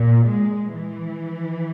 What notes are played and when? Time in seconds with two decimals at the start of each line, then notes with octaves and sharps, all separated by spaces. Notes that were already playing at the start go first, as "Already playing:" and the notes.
Already playing: A#2
0.27 G#3
0.75 E3